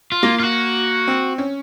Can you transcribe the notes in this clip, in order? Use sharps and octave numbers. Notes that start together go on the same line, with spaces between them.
F4
A#3
F4
F#4
C4
C#4